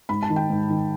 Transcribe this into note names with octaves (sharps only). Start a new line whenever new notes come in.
G#2 B5
A5
D#3
G5
G#2
D#3